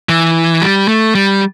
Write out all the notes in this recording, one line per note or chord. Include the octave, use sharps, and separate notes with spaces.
E3
G3
A3
G3